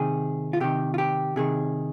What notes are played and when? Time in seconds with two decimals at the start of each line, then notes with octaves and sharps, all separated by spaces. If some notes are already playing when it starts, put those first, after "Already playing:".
Already playing: C3 D#3 G#4
0.53 F4
0.60 C3 D#3 G4
0.94 F4
0.98 G4
1.36 C3 D#3 G#4